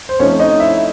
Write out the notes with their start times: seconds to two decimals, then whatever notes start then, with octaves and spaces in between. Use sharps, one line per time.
0.09 C5
0.19 F3 A3 C4 C#4 D#4 C#5
0.40 D#4 D#5
0.60 E4 E5